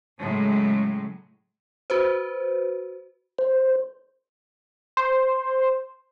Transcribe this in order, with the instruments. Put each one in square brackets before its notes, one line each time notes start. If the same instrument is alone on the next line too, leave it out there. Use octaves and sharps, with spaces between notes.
[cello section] A2 C#3 F#3 G#3
[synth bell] F#4 B4 C5
[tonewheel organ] C5
[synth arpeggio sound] C5